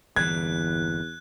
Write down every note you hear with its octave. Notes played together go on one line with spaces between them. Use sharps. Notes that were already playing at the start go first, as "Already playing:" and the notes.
G1 E2 A#2 E3 F#6 G#6